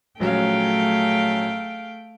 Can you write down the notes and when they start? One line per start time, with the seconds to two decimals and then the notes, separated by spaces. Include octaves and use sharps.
0.20 A#1 F#3 A3 C#4 G#4 F5 G5